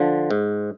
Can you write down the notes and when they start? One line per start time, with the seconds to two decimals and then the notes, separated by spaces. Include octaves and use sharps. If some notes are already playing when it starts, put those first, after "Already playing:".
Already playing: D3 F3
0.31 G#2